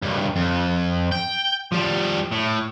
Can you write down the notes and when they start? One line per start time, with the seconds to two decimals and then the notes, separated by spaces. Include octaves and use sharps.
0.03 C#2 G2
0.36 F2
1.12 G5
1.72 F3 G3
2.31 A2